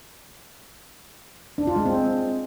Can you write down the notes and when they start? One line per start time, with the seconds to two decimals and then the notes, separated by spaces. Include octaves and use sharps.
1.58 D4
1.67 F4
1.76 G#3
1.85 C4